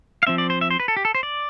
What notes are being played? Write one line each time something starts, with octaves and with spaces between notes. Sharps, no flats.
F5
F3 C4 E5
D5
C5
E5
C5
B4
A4
G4
A4
C5
D5